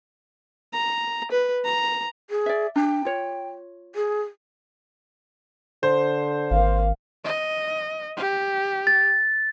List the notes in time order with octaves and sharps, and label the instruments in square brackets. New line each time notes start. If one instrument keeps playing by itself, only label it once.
[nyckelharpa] A#5
B4
A#5
[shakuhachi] G#4
[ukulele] D5 E5
[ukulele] D4 [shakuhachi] G5
[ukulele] F4 C#5
[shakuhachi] G#4
[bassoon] D3 [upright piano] C5
[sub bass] G#1 [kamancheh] A#3 F5
[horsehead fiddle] D#5
G4
[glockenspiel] A6